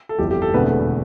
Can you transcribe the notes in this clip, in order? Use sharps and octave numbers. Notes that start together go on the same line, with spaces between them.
A4
G1 F2 E3 G4
G4
A4
E1 E2 D3 A3 C4 B4